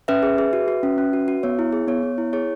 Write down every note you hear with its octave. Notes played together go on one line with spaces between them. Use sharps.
C#4 B4 E5
G#4
G#4
F#4
F#4
C#4
C#4
F#4
F#4
B3 C#5
E4
G#4
B3 C#5
B3
E4
G#4 C#5